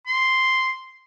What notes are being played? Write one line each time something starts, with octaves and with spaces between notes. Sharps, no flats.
C6